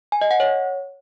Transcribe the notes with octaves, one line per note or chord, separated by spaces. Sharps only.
G#5
D#5
F#5
C#5